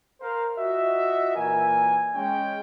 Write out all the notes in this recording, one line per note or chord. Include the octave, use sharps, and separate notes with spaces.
A#4 C5 F5
F4 F#4 D#5 E5
A#2 E3 A#4 G#5
G#3 C#4 G5